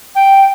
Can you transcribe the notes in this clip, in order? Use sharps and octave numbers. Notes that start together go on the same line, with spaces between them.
G5